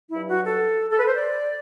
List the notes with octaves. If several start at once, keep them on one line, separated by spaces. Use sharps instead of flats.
G2 F#3 E4
F#4
A4
A4
B4
C5
D5